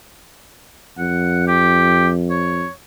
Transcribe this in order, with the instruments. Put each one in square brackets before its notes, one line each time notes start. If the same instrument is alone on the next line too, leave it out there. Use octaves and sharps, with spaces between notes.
[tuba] F2 [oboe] F#5
[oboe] G4
C#5